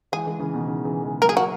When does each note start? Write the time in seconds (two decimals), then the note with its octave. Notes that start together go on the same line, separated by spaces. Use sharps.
0.12 E3 G#3 G#4
0.27 E3 G#3
0.39 C#3 E3
0.54 B2 D#3
0.67 C#3 E3
0.85 C#3 E3
1.03 E3 G#3
1.21 F#3 A#3 A#4
1.29 G#4
1.37 F#4